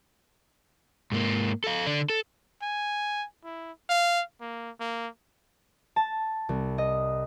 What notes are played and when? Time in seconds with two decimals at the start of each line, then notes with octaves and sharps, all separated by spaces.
1.12 G#2 A#3
1.64 A4 F5
1.86 D3 D4
2.10 A4
2.62 G#5
3.44 E4
3.89 F5
4.41 A#3
4.80 A#3
5.96 A5
6.49 C2
6.78 D#5